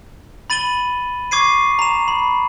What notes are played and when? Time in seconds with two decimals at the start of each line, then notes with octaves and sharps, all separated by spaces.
0.50 B5 A6 D#7 F#7 G7
1.31 C#6 D6 G#6 C7 D#7
1.79 A#5 E7
2.08 B5